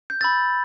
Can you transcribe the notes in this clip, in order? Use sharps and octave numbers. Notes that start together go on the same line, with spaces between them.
G6
B5 E6 G6 A6